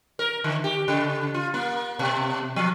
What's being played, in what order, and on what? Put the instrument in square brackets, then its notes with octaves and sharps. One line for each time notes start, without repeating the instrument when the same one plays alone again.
[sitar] A#4
D3
G4
C#3
F4
A#3
B2
F3